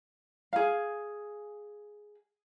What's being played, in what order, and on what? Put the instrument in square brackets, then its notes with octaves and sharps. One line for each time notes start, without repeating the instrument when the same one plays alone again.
[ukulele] G#4 F5